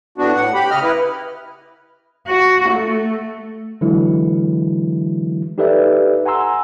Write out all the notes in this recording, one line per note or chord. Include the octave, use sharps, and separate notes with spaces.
A2 B3 D4 F#4
A2 F#5
G4 B5
C#3 D#5 F6
E4 B4
F#4
A3
D3 E3 F#3 G#3 E4
D#4 G4 A4 B4 D5 E5
F#5 G#5 A#5 C6 E6